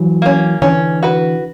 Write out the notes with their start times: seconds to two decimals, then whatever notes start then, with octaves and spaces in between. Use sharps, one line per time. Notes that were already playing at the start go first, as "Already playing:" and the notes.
Already playing: E3 F#3
0.22 A#3 C#4
0.62 D3 E3 C#4
1.03 F#4 B4